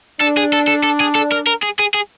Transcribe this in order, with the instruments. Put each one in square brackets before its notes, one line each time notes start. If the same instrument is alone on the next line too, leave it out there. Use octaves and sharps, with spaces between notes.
[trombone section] D4 [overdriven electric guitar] A4
[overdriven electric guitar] G#4
A4
A4
A4
G#4
A4
A#4
A#4
G#4
G#4
G#4